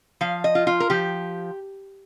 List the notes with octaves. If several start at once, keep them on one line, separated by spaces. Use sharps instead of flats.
F3 F5
D#5
F4
F4
A#4
F3 G4